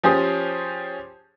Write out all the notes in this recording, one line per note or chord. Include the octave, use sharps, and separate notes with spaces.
F3 C#4 G4 G#4 C5 D#6